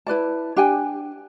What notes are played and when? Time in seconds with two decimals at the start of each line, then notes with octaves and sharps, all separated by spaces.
0.07 E4 B4 D5 A5
0.56 D4 G4 G5 G#5